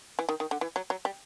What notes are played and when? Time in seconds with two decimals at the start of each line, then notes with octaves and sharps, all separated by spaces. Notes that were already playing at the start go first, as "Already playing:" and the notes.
0.19 E3
0.29 D#3
0.40 D#3
0.51 D3
0.61 E3
0.76 F#3
0.90 F#3
1.05 G3